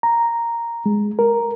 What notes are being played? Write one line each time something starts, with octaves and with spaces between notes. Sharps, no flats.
A#5
G#3
A#4